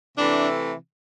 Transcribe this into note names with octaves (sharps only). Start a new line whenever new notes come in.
C3 E3 A3 D4